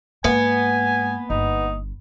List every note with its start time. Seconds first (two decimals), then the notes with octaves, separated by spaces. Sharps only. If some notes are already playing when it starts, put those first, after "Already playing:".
0.24 G#2 A#3 B3 G#5
1.30 G1 D#4